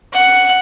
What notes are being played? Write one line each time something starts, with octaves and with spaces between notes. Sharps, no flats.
F#5